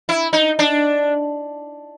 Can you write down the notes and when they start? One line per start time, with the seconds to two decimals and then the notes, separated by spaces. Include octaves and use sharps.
0.09 E4
0.33 D#4
0.59 D4